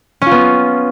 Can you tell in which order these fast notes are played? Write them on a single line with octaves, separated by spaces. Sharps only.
C#4 F4 B3